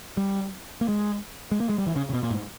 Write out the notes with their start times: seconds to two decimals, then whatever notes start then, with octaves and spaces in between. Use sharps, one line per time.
0.17 G3
0.81 A#3
0.88 G#3
1.51 G#3
1.60 A#3
1.69 G#3
1.78 G3
1.87 E3
1.96 C#3
2.10 C#3
2.13 B2
2.23 A#2
2.31 G#2